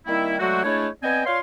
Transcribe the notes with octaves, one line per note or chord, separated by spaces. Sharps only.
D#3 G3 A#3 C4 E4
D3 F#3 G#3 A3 C4 F#4
G#3 A3 D4 E4 C#5
B3 C4 D5 D#5 G5 G#5
F4 C#5 D5 F5 C6